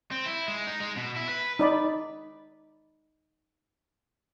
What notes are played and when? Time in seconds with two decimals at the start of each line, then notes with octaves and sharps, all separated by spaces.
0.11 C4
0.26 E4
0.48 G#3
0.67 D#4
0.80 G#3
0.96 B2
1.16 E4
1.29 B4
1.59 D#4 D5 B5